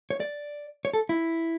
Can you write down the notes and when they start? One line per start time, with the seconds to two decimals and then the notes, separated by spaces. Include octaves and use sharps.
0.10 C#5
0.20 D5
0.85 C#5
0.93 A4
1.09 E4